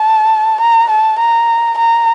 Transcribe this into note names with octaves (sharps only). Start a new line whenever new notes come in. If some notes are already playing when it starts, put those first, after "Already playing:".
Already playing: A5
A#5
A5
A#5
A#5